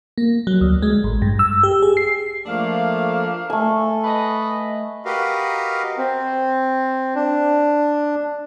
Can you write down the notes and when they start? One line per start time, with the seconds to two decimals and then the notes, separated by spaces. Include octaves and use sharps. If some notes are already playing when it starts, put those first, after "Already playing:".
0.18 A#3
0.47 F#3
0.61 D2
0.82 G#3
1.04 A1
1.22 G2
1.39 E6
1.63 G4
1.82 G#4
1.97 C7
2.46 F3 A3 A#3 D4 F5
3.50 A3 A4 G#5
4.04 B4 D#5
5.05 F#4 G4 A#4 B4 D#5 F5
5.98 C4
7.15 D4